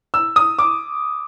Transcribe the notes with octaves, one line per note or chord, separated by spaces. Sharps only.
E6
D#6
D6